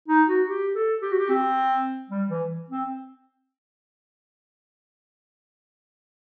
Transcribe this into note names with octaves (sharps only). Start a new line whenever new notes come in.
D#4
F#4
G4
A4
G4
F#4
G4
C4
G3
E3
C4